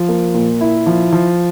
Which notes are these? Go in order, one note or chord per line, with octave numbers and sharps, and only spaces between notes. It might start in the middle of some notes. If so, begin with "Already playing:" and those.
Already playing: F3
A#3
A#2
E4
F3
F3